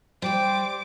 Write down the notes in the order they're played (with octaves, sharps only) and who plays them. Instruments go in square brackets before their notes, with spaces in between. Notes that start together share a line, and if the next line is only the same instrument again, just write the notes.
[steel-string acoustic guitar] G3 G4 [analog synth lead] C5 [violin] D6